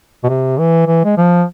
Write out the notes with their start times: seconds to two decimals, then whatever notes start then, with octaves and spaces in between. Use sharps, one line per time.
0.24 B2
0.29 C3
0.58 E3
0.87 E3
1.04 G#3
1.17 F3